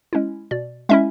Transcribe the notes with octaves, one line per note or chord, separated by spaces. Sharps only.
G#3 C#4 E4
B2 D5
G#3 C#4 E4 E5